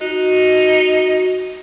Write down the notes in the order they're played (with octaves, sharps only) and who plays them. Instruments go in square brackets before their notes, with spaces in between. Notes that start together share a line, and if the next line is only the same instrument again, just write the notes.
[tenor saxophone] D#4 [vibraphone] F#4